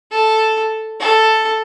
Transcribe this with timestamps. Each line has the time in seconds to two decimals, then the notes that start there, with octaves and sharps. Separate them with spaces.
0.12 A4
1.00 A4